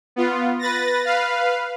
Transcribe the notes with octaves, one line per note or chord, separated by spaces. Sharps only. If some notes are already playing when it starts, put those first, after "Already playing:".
B3 F4
B4 A6 A#6
B4 F5